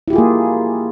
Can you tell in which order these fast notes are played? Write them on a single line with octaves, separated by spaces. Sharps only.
E4 G4 F4 G#4 A#3